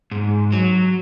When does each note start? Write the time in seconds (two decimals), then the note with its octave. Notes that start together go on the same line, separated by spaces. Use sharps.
0.11 G#2
0.52 F#3